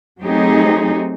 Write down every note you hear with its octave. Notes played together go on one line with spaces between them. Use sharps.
F#3 A3 C4 D#4 G4 G#4